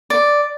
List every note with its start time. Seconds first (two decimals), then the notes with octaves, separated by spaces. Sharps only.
0.10 D5